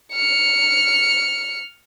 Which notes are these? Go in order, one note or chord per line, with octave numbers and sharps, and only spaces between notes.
F6 C#7